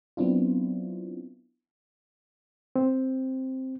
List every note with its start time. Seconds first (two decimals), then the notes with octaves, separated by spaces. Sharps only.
0.17 F#3 B3 C4 D4 E4 F4
2.76 C4